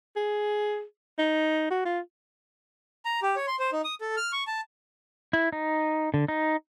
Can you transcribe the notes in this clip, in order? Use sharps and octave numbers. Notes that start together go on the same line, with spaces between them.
G#4
D#4
F#4
F4
A#5
G4
C#5
C6
C5
D#4
D#6
A4
F6
C#6
A5
E4
D#4
D3
D#4